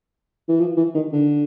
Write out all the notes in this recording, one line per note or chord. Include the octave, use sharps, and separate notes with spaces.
E3
F3
E3
D#3
D3